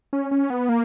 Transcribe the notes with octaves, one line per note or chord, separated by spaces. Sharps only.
C#4
C#4
B3
A#3